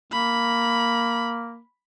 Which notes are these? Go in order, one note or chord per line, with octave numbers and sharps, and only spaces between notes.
A#3 B5